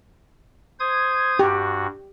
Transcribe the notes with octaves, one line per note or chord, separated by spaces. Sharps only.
C5 D#6 G#6
G2 F#4 G4